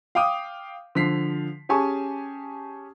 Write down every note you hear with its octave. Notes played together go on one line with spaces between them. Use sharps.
F5 G5 D6 D#6
D3 F3 B6 C7
C#4 G4 G#4 G#5 A5 C#6